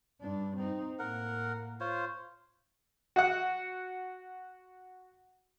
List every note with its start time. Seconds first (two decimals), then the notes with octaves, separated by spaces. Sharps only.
0.21 G2 D4
0.57 C4 D#4
0.99 A2 A#3 A#4 F#5
1.80 F4 C5 C#5
3.16 F#4 F#5